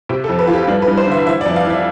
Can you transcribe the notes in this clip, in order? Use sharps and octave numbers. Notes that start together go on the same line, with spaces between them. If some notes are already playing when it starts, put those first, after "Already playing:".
C3 G4
A4
F2
B4
E3 F4
G4
G2 D4
B4
G2
C5
D3 E5
E3 E5
D5
F2
F5
E3 E5